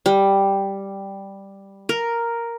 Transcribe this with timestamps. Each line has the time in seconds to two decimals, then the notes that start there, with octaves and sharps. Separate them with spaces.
0.06 G3
1.89 A#4